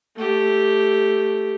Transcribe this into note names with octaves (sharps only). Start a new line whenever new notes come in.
A3 G4